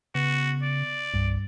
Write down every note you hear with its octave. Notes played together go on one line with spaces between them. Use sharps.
C#3 B3 F#4
D5
C2 G2